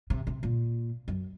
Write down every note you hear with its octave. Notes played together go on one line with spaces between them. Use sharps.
C3
C3
A#2
F#2